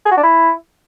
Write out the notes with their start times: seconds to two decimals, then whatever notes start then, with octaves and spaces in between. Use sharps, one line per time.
0.05 G#4
0.12 F#4
0.18 D4
0.24 E4